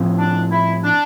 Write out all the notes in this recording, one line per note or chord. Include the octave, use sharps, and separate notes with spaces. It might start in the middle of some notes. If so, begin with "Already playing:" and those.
Already playing: A2 F3 C4
D4
E4
D4